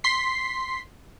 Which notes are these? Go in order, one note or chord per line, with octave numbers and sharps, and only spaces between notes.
C6 B6 C7